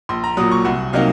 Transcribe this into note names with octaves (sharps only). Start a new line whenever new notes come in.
A#1 C6
A#5
A#2 F#3 D#6
C#6
C2 F#5
C3 F#3 A#3 D#4 F5